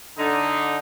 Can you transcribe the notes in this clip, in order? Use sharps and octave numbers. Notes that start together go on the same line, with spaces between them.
D3 D#4